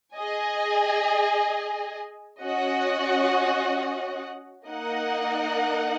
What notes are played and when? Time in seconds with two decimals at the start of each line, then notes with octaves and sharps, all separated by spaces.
0.14 G#4 D#5 G#5
2.42 C#4 F#4 D#5 F#5
4.68 A#3 D#4 A#4 D#5 F#5